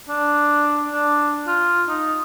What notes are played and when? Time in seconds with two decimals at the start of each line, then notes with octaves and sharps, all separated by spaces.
0.09 D4
0.92 D4
1.47 F4
1.88 D#4